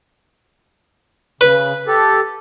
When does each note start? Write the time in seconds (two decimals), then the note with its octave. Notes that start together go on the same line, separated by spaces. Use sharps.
1.41 C#3 B4
1.87 G4 A4